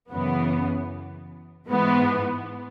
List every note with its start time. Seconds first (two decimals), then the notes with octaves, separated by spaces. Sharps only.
0.10 F#2 C#3 E3 B3
1.67 G#2 E3 B3